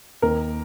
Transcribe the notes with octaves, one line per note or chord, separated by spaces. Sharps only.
D#2 A#4